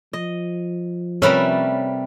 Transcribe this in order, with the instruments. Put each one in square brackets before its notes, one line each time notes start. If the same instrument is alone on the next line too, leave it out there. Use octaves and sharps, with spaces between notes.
[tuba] F3 [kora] D#5
[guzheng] C3 G3 A3 [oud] C#4 [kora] A#4 B4 E5